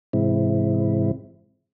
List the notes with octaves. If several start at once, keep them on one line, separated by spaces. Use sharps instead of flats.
G#2 C3 E3 G#3 C4 E4